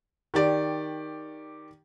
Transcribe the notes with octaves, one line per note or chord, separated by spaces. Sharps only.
D#3 G4 D5